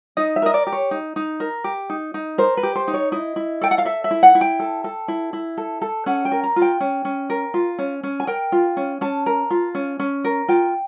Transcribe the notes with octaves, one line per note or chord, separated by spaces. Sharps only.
D#4 D#5
E5
A#4 D#5
D5
G4
C#5
D#4
D#4
A#4
G4
D#4
D#4
A#4 C5
B4
G4
C5
D#4
C#5
E4 D#5
E4
A4 G5
F#5
F5
A4 E5
E5
E4
F#5
E4
G5
A4
A4
E4
E4
A4
A4
C#4 F#5
G5
A#4
A#5
F4
G5
C#4
C#4
A#4
F4
C#4
C#4
G#5
A#4 G5
F4
C#4
C#4 A5
A#4
F4
C#4
C#4
A#4
F4 G5